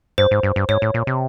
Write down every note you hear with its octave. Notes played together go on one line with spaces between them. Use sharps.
G2 C5
G#2
G2
G2
G#2 C#5
A2
A#2
C3